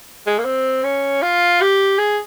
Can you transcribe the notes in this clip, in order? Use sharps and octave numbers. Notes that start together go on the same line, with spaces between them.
G#3
A#3
C4
C#4
F4
G4
G#4